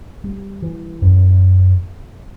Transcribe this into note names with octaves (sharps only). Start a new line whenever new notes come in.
G3
E3
F#2